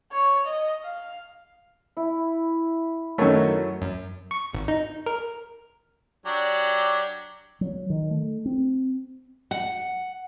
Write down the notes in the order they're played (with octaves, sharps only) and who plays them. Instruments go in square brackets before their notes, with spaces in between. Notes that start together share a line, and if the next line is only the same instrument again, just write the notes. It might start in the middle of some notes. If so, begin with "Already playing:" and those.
[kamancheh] C#5
D#5
F5
[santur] E4
[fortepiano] F#2 D#3 A3 [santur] F#3 C#5 C#6
[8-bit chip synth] F#2
C#6
G#1
D#4
A#4
[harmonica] F#3 D4 G4
[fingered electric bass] F#3
D#3
A3
C4
[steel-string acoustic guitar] F#5